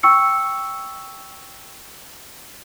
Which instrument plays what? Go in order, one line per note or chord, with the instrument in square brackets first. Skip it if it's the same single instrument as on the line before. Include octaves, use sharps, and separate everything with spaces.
[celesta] G5 C#6 E6 C#7